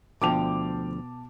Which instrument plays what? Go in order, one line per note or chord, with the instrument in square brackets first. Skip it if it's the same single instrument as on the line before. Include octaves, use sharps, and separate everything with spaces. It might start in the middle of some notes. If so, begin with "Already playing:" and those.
[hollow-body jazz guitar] D2 D3 F3 [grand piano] B2 A5 F7 [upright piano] G5 D6